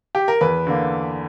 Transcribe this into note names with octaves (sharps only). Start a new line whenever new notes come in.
G4
A#4
E2 B4
D3 A#3